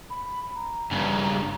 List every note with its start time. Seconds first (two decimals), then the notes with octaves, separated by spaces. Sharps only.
0.10 B5
0.56 A#5
0.91 G2 C#3